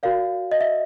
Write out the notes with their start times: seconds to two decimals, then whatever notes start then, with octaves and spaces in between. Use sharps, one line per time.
0.03 F#4 A#4 D5 F5
0.52 D#5
0.61 E5